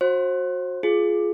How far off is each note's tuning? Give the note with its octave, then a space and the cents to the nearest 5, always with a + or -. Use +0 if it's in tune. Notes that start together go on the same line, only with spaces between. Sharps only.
F#4 -20 C5 +30
F4 +0 G#4 +15